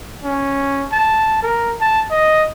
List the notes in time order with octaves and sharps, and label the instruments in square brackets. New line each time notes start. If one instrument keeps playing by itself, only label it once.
[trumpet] C#4
A5
A#4
A5
D#5